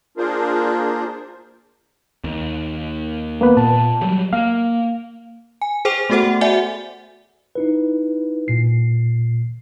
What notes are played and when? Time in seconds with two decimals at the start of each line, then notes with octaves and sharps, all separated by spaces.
0.17 A#3 D4 F4 G#4 A#4 C5
2.24 D#2
3.41 A#3 B3 B4
3.57 A#2 A5
4.01 F#3 G3
4.33 A#3 F5
5.62 G#5
5.85 G#4 C5 G5 D6 F7
6.10 A3 B3 F#4 A4 C5 F#5
6.23 A3
6.41 F#4 D5 E5 F#5 G#5
7.55 D#4 E4 B4
8.48 A#2 C7